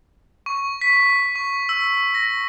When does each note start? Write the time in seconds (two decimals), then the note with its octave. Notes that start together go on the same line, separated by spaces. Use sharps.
0.46 C#6
0.81 B6
1.35 C#6
1.69 E6
2.15 A#6